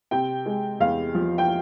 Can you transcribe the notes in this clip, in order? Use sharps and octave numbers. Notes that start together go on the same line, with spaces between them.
C3 G5
G#3
E2 F5
F3
G5